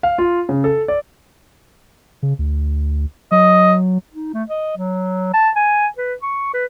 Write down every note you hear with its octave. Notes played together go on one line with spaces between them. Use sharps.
F5
F4
C#3
A4
D5
C#3
D2
F#3 D#5
D#4
A3
D#5
F#3
A5
G#5
B4
C#6
B4